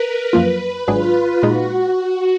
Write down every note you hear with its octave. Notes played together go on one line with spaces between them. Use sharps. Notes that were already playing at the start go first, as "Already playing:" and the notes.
Already playing: A#4 B4
F#2 F3 A#3 F4 B4
G#1 G#2 F#3 D4 F4 G#4
A#2 G#3 D#4 F#4